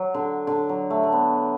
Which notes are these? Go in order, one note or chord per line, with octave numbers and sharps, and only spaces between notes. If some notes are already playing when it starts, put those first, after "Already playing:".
Already playing: F#3
D3
D3
F#3
A3
A3
B3